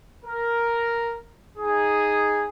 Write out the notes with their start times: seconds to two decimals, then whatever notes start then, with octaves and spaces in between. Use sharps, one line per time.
0.25 A#4
1.58 D#4 G#4